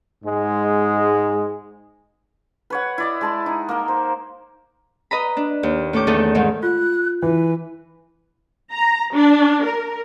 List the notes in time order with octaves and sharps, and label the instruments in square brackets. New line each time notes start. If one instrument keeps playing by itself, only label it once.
[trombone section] G#2 G#3
[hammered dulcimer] B4 C#5 F#5
E4 D5 D#5
G#3 A5 C6
D#4
A#3 A#4
C5
[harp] B4 D#5 A#5 B5
D4
D#2
A2 C#4 A4 D6 G6
E2 D#3 A3 D#4 A4 D#5
G#2 D#3
[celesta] F4 [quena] F#6
[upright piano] E3 [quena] B4
[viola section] A#5
D4
A#4